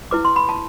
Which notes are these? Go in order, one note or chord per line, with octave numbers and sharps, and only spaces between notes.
E4 B4 D6
C6
B5
A5